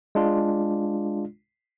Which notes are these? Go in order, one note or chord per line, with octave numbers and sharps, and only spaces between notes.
G#3 D4 F4